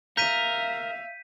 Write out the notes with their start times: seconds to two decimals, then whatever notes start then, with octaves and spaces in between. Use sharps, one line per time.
0.17 A#4 E5 F5 G6 B6 D#7